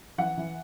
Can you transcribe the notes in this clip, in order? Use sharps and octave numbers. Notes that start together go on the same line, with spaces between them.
E3 F#5
E3